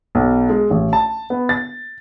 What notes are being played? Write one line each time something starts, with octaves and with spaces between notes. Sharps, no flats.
B1
G#3
A1
A5
B3
A6